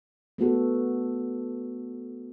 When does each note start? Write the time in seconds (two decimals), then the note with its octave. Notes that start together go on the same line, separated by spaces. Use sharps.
0.38 A3 B3 F#4 A4